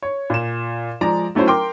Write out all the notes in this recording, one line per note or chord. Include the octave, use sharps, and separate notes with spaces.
C#5
A#2 E7
F3 G#3 D5 A#5
F#3 A3 C#4 E4 C5
A#4 G5 C6 D6